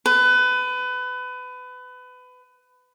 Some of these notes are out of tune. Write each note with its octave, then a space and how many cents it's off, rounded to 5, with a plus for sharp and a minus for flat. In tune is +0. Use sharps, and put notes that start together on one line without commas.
B4 +25